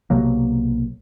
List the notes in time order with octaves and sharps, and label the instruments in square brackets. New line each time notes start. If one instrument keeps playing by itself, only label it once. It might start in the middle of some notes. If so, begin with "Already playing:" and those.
[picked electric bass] B1 C3 F#3 A#3